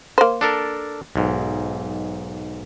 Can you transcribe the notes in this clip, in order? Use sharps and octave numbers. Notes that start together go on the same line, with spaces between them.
A#3 C5
D4 A4 A#4
B1 G#2